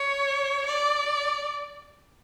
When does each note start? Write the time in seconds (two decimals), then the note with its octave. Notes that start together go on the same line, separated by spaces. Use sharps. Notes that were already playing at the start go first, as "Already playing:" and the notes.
Already playing: C#5
0.66 D5